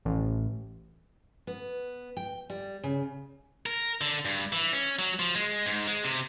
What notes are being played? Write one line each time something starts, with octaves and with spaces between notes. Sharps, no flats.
A1
B3
G5
G3
C#3
A#4
D3
G2
E3
C#4
F#3
F3
G#3
G#2
G#3
C3